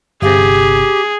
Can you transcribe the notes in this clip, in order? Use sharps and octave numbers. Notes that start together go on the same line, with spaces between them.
G1 C3 G4 G#4